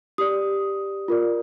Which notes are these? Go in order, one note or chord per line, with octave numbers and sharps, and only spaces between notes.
G4 D5 D#6
F4 A#4 D5